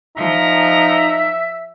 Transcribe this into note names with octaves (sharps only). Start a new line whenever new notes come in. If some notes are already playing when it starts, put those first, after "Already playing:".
F3 D#4 E5 A#5